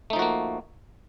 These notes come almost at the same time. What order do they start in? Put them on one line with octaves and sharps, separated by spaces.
A3 D#4 F3 F#4 A#3